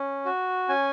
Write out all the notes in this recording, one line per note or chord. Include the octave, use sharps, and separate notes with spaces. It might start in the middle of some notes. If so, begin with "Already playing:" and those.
Already playing: C#4
F#4
C#4 G#5